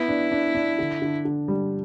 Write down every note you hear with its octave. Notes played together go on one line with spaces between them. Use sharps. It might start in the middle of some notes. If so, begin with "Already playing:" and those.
Already playing: B3 E4
D4
D4
D4
D3
D3
D3
G3